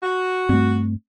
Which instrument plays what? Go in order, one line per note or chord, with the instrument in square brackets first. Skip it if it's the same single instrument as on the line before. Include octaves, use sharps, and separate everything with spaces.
[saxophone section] F#4
[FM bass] G2 [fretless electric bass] A3 C4